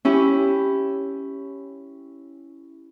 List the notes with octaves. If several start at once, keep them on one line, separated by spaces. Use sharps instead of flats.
C#4 E4 G4